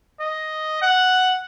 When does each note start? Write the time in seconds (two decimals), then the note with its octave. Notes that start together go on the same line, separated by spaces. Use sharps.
0.20 D#5
0.82 F#5